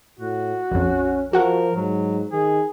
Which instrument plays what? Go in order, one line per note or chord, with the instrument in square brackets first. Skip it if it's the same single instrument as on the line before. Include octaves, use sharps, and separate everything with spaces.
[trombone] A2 [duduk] F#4
[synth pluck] A#1 F2 [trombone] C#4
[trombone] F3 [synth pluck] F#4 F#5 C#6 [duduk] A#4
[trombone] G#2 [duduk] F#3
[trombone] D#3 [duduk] G#4